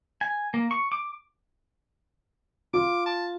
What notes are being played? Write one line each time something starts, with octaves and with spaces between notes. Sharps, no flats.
G#5
A#3
C#6
D6
F4 D6
A5